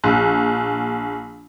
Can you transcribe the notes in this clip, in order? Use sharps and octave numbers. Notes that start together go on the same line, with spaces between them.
A#1